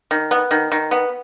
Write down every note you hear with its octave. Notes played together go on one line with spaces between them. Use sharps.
D#3
B3
D#3
D#3
B3